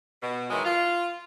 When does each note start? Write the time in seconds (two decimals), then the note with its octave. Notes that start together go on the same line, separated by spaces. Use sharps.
0.22 B2
0.50 D#3 E3 F#3 G#3
0.64 F4